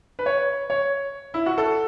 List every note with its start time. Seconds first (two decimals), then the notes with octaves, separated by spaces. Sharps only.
0.19 B4
0.26 C#5
0.70 C#5
1.34 E4
1.46 F#4
1.58 A4